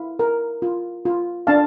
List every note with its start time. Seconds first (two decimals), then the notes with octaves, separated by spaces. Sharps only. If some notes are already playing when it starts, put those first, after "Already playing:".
Already playing: E4 F5
0.19 A#4
0.62 F4
1.05 F4
1.47 D4 F5 A5